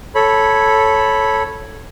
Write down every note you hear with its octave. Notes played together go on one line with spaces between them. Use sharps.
A4 C#5 B5